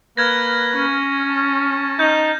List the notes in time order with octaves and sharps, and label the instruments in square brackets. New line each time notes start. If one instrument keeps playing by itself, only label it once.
[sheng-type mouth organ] A#3 B4 F#6 [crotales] F6 G#6 A#6
[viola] C#4
[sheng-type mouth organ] A5
[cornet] D#4 [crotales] G6